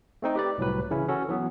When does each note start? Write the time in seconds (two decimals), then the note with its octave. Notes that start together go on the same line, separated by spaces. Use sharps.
0.22 A3 C4 D#4
0.36 G4 B4 D5
0.58 C2 A2 F#3 B4
0.91 C#3 E3 C#4 E4
1.09 C#4 F#4 A4
1.28 E3 F#3 B3